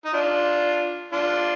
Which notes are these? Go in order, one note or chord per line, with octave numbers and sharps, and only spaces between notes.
D#4
D4 F4
D4 F4